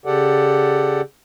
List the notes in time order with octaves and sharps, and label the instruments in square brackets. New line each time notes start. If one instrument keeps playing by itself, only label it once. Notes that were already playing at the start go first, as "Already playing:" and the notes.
[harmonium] C#3 G4 A4 D5 F#5